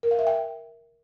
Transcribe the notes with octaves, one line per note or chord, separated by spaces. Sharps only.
A#4
F5
E5
G5